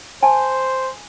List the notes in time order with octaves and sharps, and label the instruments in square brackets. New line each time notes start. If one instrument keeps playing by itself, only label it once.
[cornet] C5 [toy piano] G#5 A5